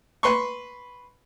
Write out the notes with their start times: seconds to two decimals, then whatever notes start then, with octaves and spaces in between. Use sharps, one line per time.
0.23 B4 C6 C#6